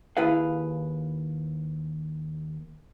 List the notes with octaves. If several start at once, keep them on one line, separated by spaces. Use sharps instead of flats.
D#2 E4 G#4 B4 F5